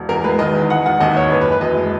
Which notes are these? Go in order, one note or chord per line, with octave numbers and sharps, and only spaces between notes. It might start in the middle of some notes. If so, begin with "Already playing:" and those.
Already playing: E1
E2 A#4
G#3 B4
D#3 D#5
E2
E1 F#5
D#3 F#5
D#2 D#5
A#3 C#5
F#1 B4
B4
E3
B4
F#2 D#5
G#3